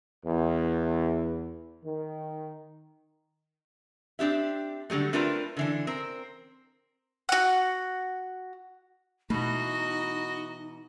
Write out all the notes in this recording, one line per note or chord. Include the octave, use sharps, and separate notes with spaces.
E2
D#3
C4 D4 G4 E5
D3 F#3 G3 A3
A3 C4 D4 F4 A#4 B4
D3 E3 D4
C4 A#4
F#4 F#5
B2 E3 A3 D#4 F#4 D#5